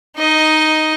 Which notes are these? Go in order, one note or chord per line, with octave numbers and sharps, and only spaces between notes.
D#4 D#5